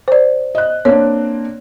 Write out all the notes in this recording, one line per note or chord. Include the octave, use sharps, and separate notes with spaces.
C5 D5
D#5 F#6
A#3 C4 D4 C#5